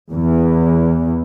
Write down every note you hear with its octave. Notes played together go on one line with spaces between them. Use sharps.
E2